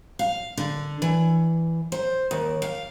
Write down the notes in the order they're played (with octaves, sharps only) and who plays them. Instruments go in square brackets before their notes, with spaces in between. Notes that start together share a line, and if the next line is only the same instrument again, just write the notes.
[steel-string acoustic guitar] F5
D3
E3
C5
D#2
F5